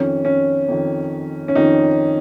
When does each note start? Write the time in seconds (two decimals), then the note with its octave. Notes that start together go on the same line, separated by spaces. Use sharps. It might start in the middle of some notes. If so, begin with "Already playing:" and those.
Already playing: F2 D#3 C#4
0.25 C#4
0.68 F2 D#3
1.48 C#4
1.55 F2 D#3 D#4